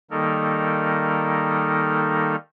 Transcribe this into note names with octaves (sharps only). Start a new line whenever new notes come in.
D#3 G3 A#3 D#4 A4 A#4